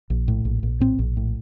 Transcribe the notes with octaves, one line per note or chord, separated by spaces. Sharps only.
A#1
A2
A#1
A#1
A2 C4
A#1
A2